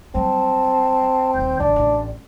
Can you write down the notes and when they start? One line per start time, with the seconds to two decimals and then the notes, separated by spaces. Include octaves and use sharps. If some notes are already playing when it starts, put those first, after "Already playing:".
0.15 F#3 G3 C4 A5
1.34 D#1 D#3 G6
1.60 G#1 D#3 D4 D5
1.76 A1 C#4 D5